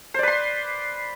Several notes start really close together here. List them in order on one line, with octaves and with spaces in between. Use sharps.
C5 D5 B4 C6